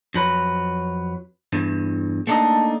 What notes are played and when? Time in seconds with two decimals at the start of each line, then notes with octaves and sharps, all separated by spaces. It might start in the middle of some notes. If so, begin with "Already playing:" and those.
0.14 F2 F#3 B4
1.53 E2 G2 E3
2.27 A3 A#3 D4 D#4 A4 D#5